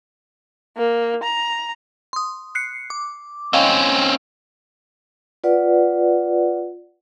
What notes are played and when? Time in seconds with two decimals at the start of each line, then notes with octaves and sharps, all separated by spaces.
0.77 A#3
1.23 A#5
2.13 C6 D#6
2.55 F#6 C7 C#7
2.90 D6
3.53 C4 C#4 D#5 F5 G5
5.44 F4 B4 D5 F#5